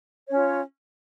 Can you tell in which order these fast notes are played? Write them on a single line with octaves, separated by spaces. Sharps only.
C#5 C#4 F4